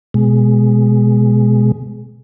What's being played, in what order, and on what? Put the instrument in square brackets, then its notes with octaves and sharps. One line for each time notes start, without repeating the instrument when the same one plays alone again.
[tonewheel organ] B2 G#3